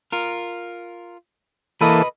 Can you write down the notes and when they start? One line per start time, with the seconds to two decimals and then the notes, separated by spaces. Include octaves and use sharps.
0.12 F4 A#4
1.81 E3 A#3 A4 B4 D#5